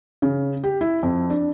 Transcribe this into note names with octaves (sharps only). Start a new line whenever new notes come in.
C#3
G4
E4
F2
D4